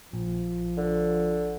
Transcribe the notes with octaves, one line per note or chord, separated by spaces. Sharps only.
A#1 F3
D3